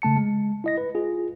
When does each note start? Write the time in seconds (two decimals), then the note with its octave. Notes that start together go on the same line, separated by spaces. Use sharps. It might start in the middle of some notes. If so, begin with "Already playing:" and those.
0.02 C#3 A3 A5 C#7
0.16 G#3
0.64 E4 D#5 A#6
0.78 B4
0.95 F4 G#4